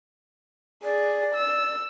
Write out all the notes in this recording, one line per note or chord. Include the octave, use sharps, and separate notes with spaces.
G#4 D5
E6